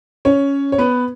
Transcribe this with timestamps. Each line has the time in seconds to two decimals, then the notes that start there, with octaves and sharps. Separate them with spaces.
0.25 C#4 C#5
0.72 C#5
0.78 B3 B4